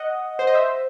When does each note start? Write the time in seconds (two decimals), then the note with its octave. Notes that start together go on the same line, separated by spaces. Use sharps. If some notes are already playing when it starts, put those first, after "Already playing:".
Already playing: D#5 F#5
0.39 C5
0.47 D#5
0.54 C5 E5